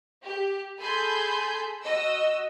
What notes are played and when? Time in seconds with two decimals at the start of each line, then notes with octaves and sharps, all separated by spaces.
0.24 G4
0.79 G#4 A4 G#5 B5 C6 G6
1.83 F#4 D#5 E6